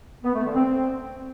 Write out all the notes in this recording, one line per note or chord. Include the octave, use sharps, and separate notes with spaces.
B3
A3
D3
C4